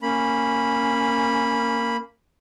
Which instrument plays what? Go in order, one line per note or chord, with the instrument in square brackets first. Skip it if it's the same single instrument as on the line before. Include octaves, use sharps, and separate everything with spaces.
[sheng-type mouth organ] A#3 B5 [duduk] C#4